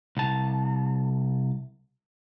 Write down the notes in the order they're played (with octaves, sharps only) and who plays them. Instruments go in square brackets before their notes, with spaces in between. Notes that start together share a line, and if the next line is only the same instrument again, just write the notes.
[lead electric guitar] C2 A5